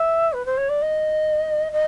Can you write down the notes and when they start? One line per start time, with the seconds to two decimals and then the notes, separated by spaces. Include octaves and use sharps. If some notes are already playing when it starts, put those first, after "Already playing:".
Already playing: E5
0.33 B4
0.45 C5
0.57 C#5
0.69 D5
0.82 D#5
1.72 D#5